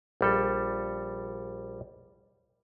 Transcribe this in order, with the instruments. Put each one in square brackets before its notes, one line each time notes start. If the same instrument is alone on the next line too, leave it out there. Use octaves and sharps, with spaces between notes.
[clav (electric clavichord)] A#1 G3 A4